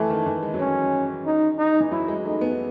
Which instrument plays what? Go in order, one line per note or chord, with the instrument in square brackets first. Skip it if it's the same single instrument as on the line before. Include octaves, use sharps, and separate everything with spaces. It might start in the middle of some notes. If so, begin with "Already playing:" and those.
Already playing: [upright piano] E3 [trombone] A3
[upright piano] D#3
E3
G#3
F#3
[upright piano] G#3 [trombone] C#4
[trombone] D#4
D#4
[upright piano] E3
[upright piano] F#3 [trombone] E4
[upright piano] G#3
[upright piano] A3 [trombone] D#4
[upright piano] B3